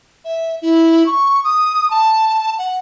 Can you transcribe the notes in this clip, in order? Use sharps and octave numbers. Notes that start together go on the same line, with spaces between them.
E5
E4
C#6
D#6
A5
F#5